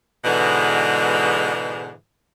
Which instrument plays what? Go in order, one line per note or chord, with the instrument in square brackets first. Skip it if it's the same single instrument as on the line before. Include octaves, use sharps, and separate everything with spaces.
[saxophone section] G#2 B2 D3 E3 G#3